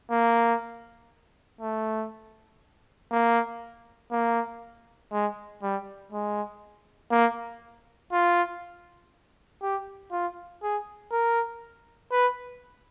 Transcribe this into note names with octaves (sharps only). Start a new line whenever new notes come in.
A#3
A3
A#3
A#3
G#3
G3
G#3
A#3
F4
G4
F4
G#4
A#4
B4